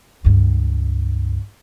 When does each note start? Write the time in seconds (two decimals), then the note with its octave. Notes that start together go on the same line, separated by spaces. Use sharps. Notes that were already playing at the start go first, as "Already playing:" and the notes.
0.25 C#2 G2